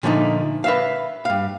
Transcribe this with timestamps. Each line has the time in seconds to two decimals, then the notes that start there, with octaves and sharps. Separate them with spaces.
0.03 A#2 D3 F3 A3 C#4 D#4
0.64 B4 E5 F5
1.25 G2 F5